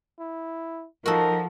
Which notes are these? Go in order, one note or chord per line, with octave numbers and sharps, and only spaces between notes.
E4
F3 D#4 F#4 A4 A#4